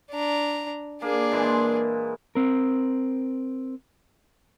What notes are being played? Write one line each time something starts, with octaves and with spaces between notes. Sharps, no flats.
D4 A#5
A#3 D4 G#4
A#2 E3 G#3
C4 A#4